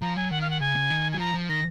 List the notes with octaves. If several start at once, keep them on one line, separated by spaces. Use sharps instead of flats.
F3 A#5
F#3 G#5
D#3 F#5
F5
F#5
C#3 G#5
C#3
D#3
F#3 G#5
F3 A#5
F3
D#3 A#6